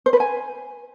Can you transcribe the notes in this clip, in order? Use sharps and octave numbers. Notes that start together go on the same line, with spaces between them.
C5
B4
G#5